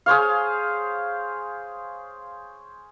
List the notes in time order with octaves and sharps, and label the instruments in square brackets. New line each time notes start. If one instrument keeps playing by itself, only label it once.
[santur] G#4 C5 C#5 F5